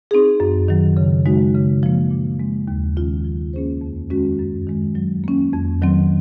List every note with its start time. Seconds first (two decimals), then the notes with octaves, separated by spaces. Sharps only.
0.11 C4 D#4 G#4
0.40 F#2
0.68 D#3 F#3
0.97 C#3
1.26 G#3 D#4 F#4
1.54 C#3
1.83 F3 A#3
2.11 A#2
2.40 G#3 C4
2.68 D#2
2.96 D#3 G#3 C#4 F4
3.25 F3
3.53 A#3 C#4 G#4 C5
3.81 F2
4.10 D#3 G#3 C#4 F#4
4.39 F#2
4.67 D#3 G#3
4.95 F#3
5.24 A#3 C#4
5.53 F2
5.81 D#3 F#3 C4